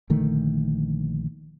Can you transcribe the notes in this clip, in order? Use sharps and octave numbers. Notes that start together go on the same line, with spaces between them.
A#1 D3 D#3 A3